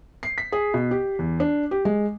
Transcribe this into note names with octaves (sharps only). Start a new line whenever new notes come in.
C7
B6
G#4
B2
G4
E2
D4
G4
G#3